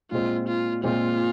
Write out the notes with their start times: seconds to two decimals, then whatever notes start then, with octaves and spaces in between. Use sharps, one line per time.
0.11 A#2 G#3 C4 F4
0.48 F4
0.83 A#2 G#3 C4 F4